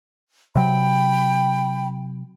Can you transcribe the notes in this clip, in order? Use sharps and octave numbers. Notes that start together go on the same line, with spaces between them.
C3 F#3 G5 B5